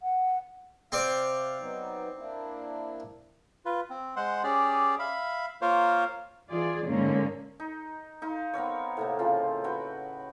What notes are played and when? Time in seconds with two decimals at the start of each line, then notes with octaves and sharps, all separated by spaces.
0.02 F#5
0.92 C3 C4 C5 D5 F5
1.60 F#3 B3 D#4
2.18 A#3 D4 E4
3.65 F4 B4
3.90 C4
4.16 G#3 C5 F#5 C6
4.43 C#4 G4 G#4 D5
4.99 E5 F5 B5
5.61 A#3 F4 A#4 C5 C#5 F5
6.49 E3 F4 G#4 D5
6.86 G#2 D3 A#3 C#4
7.60 D#4
8.22 D#4 F5 C6
8.54 B3 C4 A#4 C#5
8.97 A2 C3 A#3
9.19 C#3 F3 C4 F4
9.64 F#4 B4 G5